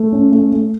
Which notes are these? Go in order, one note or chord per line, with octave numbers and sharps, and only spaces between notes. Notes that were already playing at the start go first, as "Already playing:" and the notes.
Already playing: A3
C#4
A3
A3